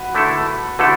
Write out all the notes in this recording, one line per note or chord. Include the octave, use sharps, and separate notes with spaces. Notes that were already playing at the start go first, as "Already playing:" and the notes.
Already playing: F#4 B4
D3 A3 E4 A4
D3 A3 E4 F#4 A4 B4